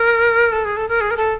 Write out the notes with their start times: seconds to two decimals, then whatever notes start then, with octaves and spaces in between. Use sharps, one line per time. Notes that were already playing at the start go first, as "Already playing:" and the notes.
Already playing: A#4
0.52 A4
0.65 G#4
0.77 A4
0.89 A#4
1.01 G#4
1.11 A#4
1.17 A4